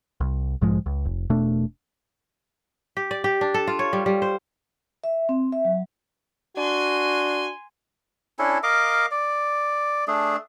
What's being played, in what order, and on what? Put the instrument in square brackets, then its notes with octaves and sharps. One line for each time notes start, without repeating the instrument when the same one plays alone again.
[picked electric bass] C2
B1 G#2 F3 G#3
C#2
F1
E1 B2 A3 D4
[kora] G4
D5
G4
D4
A4
F4
C#5
G3
G3
C5
[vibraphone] E5
C4
E5
F#3
[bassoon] D4 [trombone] F#4 [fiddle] G#5 C6
[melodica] C#4 D4 E4 A4
A#4 D#5 F5 D6
D5
A3 D4 G#4